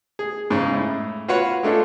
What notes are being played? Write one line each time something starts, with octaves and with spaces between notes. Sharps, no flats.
G#4
G#2 C#3
A2
F4 F#4 B4 C#5 F#5
G#3 A3 D4 F4 A4